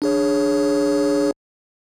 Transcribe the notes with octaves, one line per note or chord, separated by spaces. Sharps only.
D4 G#4 C#5